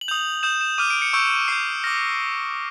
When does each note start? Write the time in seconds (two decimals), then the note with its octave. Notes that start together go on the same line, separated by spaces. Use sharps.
0.01 F#7
0.08 D#6 G6 F7
0.43 D#6 G6 E7
0.61 E7
0.78 D6 F6 D#7
0.90 D7
1.02 C#7
1.13 C#6 E6 G6 D7
1.48 D6 G6 C7
1.84 D6 F6 A#6